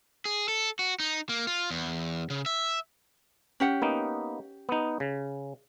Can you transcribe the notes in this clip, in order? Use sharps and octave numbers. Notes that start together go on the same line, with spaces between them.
G#4
A4
F#4
D#4
A#3
F4
E2
C#3
E5
C#4 G4 F#5
A#3 B3 D#4
B3 D#4
C#3